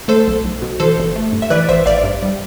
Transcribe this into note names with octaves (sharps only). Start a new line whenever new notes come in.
A3 A4 C5
B1
B1
B2
E3 A4 C5
G1
A3
G2
E5
E3 B4 D5
A1 C5 E5
A1 D5 F5
G2
G3